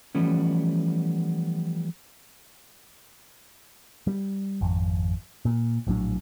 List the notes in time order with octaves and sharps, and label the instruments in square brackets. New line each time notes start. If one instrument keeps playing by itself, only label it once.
[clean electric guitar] E3 F3 G3 A3 B3 C#4
[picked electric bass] G3
G#1 F2
A#2
A#1 A2 F#3 D4